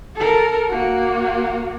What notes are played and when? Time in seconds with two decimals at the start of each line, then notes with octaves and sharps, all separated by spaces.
0.16 A4 A#4
0.70 A#3 F#4